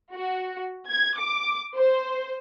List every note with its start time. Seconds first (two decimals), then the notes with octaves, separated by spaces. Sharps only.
0.14 F#4
0.88 G#6
1.18 D6
1.76 C5